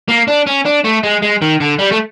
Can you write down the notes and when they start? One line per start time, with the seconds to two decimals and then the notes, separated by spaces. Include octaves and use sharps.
0.08 A#3
0.28 D4
0.47 C#4
0.65 D4
0.84 A3
1.03 G#3
1.22 G#3
1.42 D#3
1.60 D3
1.79 G3
1.92 A3